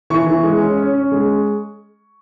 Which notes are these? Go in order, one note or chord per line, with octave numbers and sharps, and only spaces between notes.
E3 C#6
E3
G#3
C#4
C#4
C#4
G#3